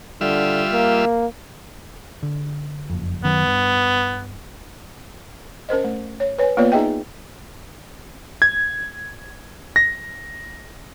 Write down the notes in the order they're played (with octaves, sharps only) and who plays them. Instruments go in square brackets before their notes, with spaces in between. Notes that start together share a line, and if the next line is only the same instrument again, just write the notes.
[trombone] D3 [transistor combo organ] G3 F4 E5
[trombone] A#3
[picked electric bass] D3
F#1 F2
[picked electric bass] F#2 D#3 F#3 [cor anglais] B3
[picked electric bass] G2
[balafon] C#4 A#4 C5 D#5
A3
C#5
B4 C#5 G#5
A#3 B3 F4 B4 C#5 D5
D#4 G#4 D#5 E5 G5 G#5
[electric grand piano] G#6
A#6